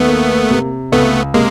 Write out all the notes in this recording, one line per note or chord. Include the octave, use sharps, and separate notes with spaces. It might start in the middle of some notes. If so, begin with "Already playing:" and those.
Already playing: D#2 A3 B3
A#3
C3
C#2 A3 B3
C3 G#3 A#3